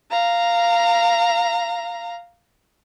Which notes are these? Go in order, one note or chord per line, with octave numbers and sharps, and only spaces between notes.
F5 A#5